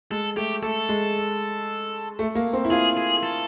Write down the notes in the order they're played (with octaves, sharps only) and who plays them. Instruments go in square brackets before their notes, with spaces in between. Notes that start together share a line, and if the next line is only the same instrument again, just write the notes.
[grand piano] G#3 [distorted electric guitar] A4
[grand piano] A3 [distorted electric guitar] G4
[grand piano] A3 [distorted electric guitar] A4
[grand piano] G#3
A3
A#3
C4
E4
[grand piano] F4 [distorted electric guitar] G#4
[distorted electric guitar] G#4
A4